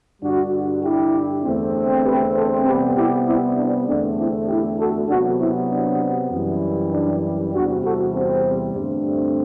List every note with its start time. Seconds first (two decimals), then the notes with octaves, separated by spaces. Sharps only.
0.22 G2 D3 G3 D4 F#4
0.83 E4 G4
1.44 E2 D3 A3 C4
2.04 G4 B4
2.35 A4 C5
2.65 C3 G3 B3 G4 B4
2.96 E4 G4
3.27 C4 E4
3.57 D4
3.87 E2 D3 A3 C4 D4
4.18 C4 E4
4.48 E4 G4
4.79 F#4 A4
5.09 C3 F#3 B3 D4 F#4
5.39 C4 E4
5.71 D4
6.31 F#2 E3 G3
6.92 D4
7.54 E2 C3 G3 D4 F#4
7.84 F#4 A4
8.14 C4
8.75 G2 D3 A3 C4